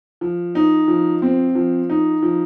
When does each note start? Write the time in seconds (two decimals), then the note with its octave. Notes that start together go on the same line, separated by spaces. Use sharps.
0.21 F3
0.55 D#4
0.88 F3
1.22 C4
1.55 F3
1.90 D#4
2.23 F3